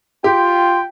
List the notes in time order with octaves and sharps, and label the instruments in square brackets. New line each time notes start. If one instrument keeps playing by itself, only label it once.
[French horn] F4 [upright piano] G4 [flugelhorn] G5 [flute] C6